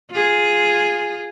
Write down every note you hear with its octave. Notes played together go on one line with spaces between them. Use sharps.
F4 G#4